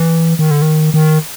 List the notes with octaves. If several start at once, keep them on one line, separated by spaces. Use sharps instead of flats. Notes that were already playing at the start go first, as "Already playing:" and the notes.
Already playing: E3
D#3
D3
D#3
D#3